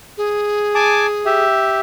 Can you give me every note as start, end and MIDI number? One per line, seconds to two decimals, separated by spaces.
0.18 1.44 68
0.75 1.06 80
0.75 1.06 81
0.75 1.06 86
1.26 1.80 67
1.26 1.80 76